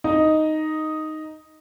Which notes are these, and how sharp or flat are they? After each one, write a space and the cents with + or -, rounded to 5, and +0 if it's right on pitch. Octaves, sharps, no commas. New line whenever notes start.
D#4 +0 D#5 +0